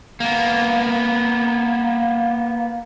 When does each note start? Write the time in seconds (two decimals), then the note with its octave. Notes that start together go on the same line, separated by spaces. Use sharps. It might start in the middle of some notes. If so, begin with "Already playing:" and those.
0.20 A#3 B3